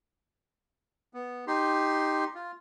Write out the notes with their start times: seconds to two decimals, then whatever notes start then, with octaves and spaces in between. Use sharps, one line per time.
1.14 B3
1.47 D#4 G4 C6
2.35 F4